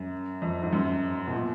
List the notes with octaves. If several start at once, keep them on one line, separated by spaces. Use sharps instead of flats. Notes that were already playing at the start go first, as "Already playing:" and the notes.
Already playing: F#2
F2
G#2
F#2
B2
A#2